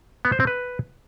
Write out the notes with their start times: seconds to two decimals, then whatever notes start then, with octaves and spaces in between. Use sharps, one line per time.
0.25 B3
0.32 C5
0.40 C4
0.47 B4